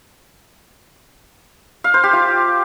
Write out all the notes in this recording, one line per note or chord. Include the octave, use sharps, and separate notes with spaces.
F5
C5
G4
F4